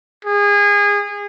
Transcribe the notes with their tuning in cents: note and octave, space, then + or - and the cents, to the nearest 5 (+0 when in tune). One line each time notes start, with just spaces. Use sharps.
G#4 -25